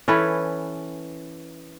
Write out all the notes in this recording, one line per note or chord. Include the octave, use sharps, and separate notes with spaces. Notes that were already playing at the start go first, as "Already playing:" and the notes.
E3 C#4 A4 B4